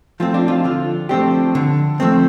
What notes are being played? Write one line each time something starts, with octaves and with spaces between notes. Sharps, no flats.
F3 A3 C4 F4
D4
F4
D3 F4
F3 A3 C4 D4 G4
D3
F3 A3 C4